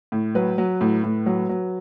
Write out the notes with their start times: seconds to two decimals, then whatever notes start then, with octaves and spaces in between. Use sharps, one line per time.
0.12 A2
0.35 F#3 B4
0.58 F#3
0.81 A2
1.04 A2
1.26 F#3
1.49 F#3